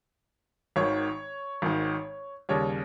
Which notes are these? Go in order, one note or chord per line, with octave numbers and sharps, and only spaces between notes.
G#1 G#2 D#3 C#5
G#1 G#2 D#3
D#2 C#3 G3 C#5